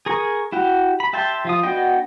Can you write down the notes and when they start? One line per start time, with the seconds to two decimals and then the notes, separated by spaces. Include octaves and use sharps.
0.06 G#4 A#4 C#6
0.52 E4 F#4 G4
1.00 B5
1.13 G4 E5 G5 A5 C6
1.45 F3 F4 D#6
1.63 B3 D4 F#4 D#5 G5